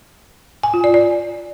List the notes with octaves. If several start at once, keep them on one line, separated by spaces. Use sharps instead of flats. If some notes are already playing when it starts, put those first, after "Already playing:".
G#5
F4
D5
D5